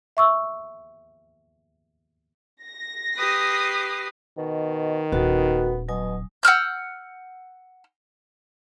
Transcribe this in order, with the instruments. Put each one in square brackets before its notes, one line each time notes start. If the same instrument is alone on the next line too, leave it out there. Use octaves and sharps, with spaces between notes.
[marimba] E5 C#6 E6
[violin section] A#6
[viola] G4 B4 [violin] D#6 C7
[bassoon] B2 [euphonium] D#3
[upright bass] D#1 [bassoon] B3 [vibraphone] F#4 A4
[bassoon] B2 [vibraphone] F#3 G#5 D#6
[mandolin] F#5 E6 F6 G6